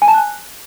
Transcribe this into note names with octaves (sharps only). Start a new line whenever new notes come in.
G#5
A5
F#6